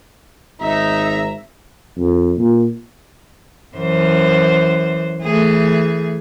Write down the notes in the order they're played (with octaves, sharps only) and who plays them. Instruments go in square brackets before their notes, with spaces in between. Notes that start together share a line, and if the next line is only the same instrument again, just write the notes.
[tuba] G#1 [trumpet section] D#4 [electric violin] E5 E6 [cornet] A#5
[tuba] F2
A#2
[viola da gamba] F#2 E3 C5
E3 A3 G#4